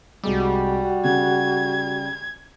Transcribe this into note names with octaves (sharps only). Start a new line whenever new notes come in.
C2 G3 G#3 F#4 D6
C#3 G#6